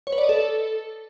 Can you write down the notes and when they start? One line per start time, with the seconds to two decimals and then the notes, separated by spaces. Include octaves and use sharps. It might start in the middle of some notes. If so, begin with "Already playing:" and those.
0.07 C#5
0.12 B4
0.18 D5
0.23 D#5
0.29 A4